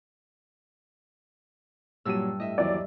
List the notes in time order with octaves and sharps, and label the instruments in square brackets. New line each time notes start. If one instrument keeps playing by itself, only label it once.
[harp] G2 G3 E6 [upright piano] A#2 F#3 D#7
[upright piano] A2 [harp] D#5 E5
[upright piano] D#2 E3 F#3 [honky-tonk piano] D5